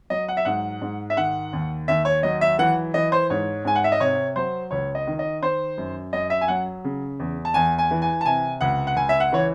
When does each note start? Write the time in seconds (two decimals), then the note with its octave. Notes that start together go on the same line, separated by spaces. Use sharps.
0.10 F#3 D#5
0.28 F#5
0.37 E5
0.45 G#2 F#5
0.81 G#2
1.10 E5
1.17 D#3 F#5
1.53 D#2
1.88 D#2 E5
2.05 C#5
2.23 F#3 D#5
2.41 E5
2.58 E3 F#5
2.94 E3 D#5
3.12 C5
3.30 G#2 C#5
3.65 G#2 G#5
3.75 F#5
3.84 E5
3.92 D#5
4.00 C3 C#5
4.36 F#3 C5
4.71 C#2 C#5
4.95 D#5
5.07 D#3
5.19 D#5
5.42 D#3 C5
5.78 F#2
6.13 F#2 D#5
6.30 E5
6.41 G#5
6.48 F#3 F#5
6.84 C#3
7.20 E2
7.45 A5
7.54 E2 G#5
7.79 G#5
7.91 E3
8.02 G#5
8.21 A5
8.26 C3 G#5
8.61 C#2 F#5
8.87 F#5
8.96 C#2 G#5
9.09 E5
9.20 F#5
9.32 E3 C#5